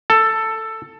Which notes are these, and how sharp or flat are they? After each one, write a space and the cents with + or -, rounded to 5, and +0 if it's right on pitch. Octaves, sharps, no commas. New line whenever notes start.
A4 +10